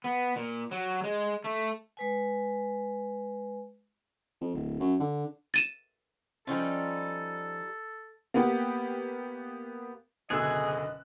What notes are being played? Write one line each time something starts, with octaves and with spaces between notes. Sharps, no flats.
B3
A#2
F#3
G#3
A3
G#3 B4 G#5
F2
D1
F#2
D3
A6 D#7 E7
F3 G3 C#4 D#4 F4 A4
A#3 B3 G4
F#1 B2 D3 G#4 D#5 E6 F#6